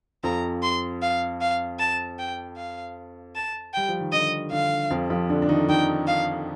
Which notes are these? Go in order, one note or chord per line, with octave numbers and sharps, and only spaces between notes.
F2 F3 A#5
C6
F5
F5
A5
G5
F5
A5
G3 G5
F3
D#3
D3 D#5
D3 F5
F2 F3
F2 F3
D3 D4
D4
D#3 D#4
D#3 D#4 G5
F5